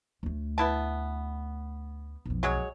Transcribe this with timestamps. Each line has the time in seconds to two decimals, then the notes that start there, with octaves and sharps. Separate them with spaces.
0.23 D2 A3
0.58 B3 E4 A5
2.25 B1 F2
2.43 F#3 G#3 C#5